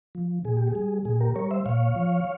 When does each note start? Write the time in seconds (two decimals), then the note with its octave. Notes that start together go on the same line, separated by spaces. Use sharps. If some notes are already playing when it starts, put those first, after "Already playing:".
0.15 F3
0.45 A#2 G#4
0.57 G4
0.67 G#4
0.75 G3
1.05 A#2 G#4
1.21 G4 A#4
1.36 G3 A#4 C#5
1.51 C5 E5
1.66 A#2 C#5 F5
1.96 F3